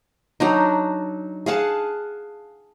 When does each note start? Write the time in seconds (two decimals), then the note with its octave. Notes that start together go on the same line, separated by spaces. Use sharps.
0.40 F#3 D4 D#4
1.46 G#4 F5 F#5 A5